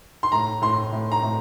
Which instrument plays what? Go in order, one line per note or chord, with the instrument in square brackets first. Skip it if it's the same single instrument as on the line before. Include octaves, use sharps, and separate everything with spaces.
[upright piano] C6
A2 A#5
A2 C6
A2
A#5
A2